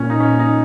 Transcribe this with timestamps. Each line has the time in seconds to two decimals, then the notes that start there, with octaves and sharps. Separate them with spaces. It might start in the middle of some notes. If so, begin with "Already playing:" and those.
Already playing: A#2 C#4
0.10 D#4
0.20 C#4
0.39 D#4